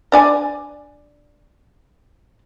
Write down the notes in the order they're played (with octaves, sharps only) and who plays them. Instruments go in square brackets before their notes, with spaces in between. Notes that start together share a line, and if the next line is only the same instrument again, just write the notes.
[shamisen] D4 D5 G#5